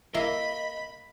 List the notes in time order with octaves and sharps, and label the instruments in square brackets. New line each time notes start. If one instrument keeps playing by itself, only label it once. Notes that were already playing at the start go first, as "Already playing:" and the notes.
[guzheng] A#3 [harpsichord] E4 E5 [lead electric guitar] D#5 [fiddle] B5